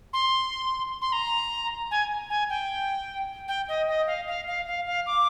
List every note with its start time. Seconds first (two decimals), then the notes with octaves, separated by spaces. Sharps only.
0.13 C6
1.02 C6
1.13 A#5
1.91 G#5
2.30 G#5
2.49 G5
3.48 G5
3.68 D#5
3.88 D#5
4.07 F5
4.27 F5
4.47 F5
4.67 F5
4.87 F5
5.07 D6